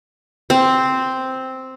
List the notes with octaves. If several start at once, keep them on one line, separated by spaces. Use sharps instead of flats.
C4